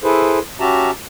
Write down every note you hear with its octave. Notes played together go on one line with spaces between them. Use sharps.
E4 G#4 A4 B4 C5
C#4 F#4 G4 E5 A5 A#5